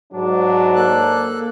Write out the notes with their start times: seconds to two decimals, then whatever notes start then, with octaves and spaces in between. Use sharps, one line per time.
0.13 G#2 F#3 D4
0.76 A#3 A4 F#6